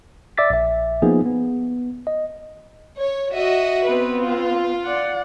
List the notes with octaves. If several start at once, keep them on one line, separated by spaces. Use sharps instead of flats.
D5 E5 D6 E6 A6 B6
A#1 E5
F3 A#3 B3 D#4 G#4
B3
D#5
C#5
F#4 D#5 E5
B3 C4 B4
F4
D5 F#5